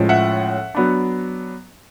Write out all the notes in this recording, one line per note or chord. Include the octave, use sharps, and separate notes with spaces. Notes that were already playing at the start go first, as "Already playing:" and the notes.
Already playing: A2 F3 G#3 C#4
E5 F#5
F#3 B3 D4